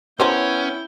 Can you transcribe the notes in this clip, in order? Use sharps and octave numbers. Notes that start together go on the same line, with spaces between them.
B3 C#4 E4 A#4 C5 C#5 G5